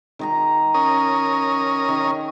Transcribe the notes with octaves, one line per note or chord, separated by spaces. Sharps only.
D#3 D#5 A#5
C#4 A#4 D#6
D#3